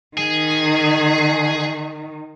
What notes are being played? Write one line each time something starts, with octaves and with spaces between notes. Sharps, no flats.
D#3 G#4